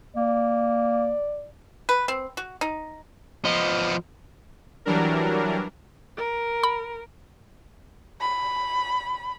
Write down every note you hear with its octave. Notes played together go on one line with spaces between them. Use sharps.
A#3 D5
B4
C4
F#4
D#4
F3 B3 D#5
E3 F#3 G3 D4 A#4
A#4
B5
B5